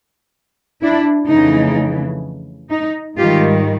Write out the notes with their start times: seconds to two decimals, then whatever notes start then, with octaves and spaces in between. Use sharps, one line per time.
0.82 D4 E4
1.28 F2 C#3 E3 A3 D#4
2.70 D#4
3.17 G#2 D#3 G3 F4 G4